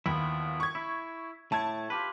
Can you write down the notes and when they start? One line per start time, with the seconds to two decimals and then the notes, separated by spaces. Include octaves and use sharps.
0.06 D#2 F3 B3 E4
0.60 C#6 G#6
0.75 E4
1.52 A2 A3 A5 G#6
1.90 F4 G4 B4